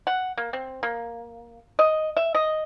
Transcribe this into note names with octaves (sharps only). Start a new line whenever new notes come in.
F#5
A#3
C4
A#3
D#5
E5
D#5